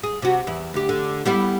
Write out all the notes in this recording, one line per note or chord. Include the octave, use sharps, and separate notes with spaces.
G#4
C3 F#4
E2 E4
D2 G4
D3
G3 B3 E4